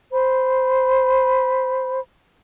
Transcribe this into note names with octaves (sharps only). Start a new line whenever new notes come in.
C5 B5